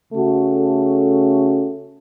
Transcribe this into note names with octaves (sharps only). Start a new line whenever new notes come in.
C#3 A3 C#4 F#4